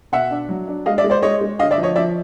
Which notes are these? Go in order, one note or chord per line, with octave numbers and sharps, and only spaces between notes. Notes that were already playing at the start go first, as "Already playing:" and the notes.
B2 E5 F#5
D4
F#3
D4
G#3 D#5 F5
D5 E5
G#3
C5 D5
G#3 C#5 D#5
G#3
D3 D#5 F5
D5 E5
F3
C#5 D#5
F3 D5 E5